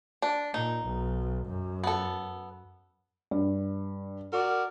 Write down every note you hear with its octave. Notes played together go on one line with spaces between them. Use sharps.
D4
A#2 D#4
B1
F#2
B3 A4
G2
F#4 A#4 D5